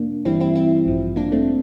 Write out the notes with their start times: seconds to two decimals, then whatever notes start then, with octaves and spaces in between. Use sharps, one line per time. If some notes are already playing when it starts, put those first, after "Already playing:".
Already playing: F2 C3 A#3 D4
0.25 G1 G2 E3 G3 C4 E4
0.40 C4 E4
0.55 C4 E4
0.86 A1 G2 F3
1.16 A#3 D4
1.32 A3 C4